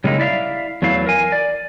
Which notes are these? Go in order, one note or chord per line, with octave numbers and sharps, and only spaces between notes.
C#3 G3 G#3 A#3 D#4 E4
E4 D5 E5 F5
E2 F#3 A3 E4 F5
A#4 G#5
D5